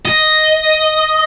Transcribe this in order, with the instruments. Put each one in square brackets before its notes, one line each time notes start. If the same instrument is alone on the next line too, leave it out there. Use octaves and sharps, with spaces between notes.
[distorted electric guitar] D#5